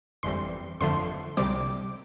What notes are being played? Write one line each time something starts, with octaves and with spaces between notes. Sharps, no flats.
G1 F2 E3 G3 C4 C6
G1 F2 D3 F3 A3 C6
C2 C3 G3 C4 D6